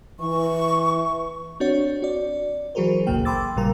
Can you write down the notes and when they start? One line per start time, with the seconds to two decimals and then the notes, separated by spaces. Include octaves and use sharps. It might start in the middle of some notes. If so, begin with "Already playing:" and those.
0.20 E3 C#6
1.60 C4 D4 F#4 C#5
2.02 F#4 D5
2.75 E3 F#3 F#4 G#4 A#4 C5
3.07 G#1 D2 A#2 C#3 A#3 G5
3.25 G5 B5 C6 D6 E6 A6
3.56 A1 A#2 C#3 G3 A#4 A#5